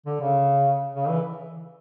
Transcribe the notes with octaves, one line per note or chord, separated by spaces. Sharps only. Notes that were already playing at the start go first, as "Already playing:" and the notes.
D3
C#3
C#3
E3